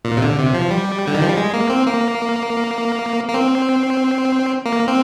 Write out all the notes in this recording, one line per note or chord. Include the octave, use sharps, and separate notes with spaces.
A#2
C3
D3
C3
F3
G3
D3
D#3
F3
G3
G#3
A#3
C4
A#3
A#3
C4
A#3
C4